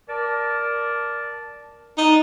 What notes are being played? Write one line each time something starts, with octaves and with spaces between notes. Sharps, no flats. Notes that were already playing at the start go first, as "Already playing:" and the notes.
A#4 D5 A5
B3 D4 D#4